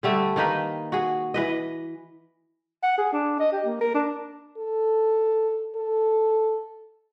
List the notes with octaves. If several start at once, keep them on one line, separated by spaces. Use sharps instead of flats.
D3 G3 A3
D#3 A#3 D#4 B4
F#4 G#4
E3 B4 D#5
F#5
G#4
D4
D#5
G4
A#3
A#4
D4
A4
A4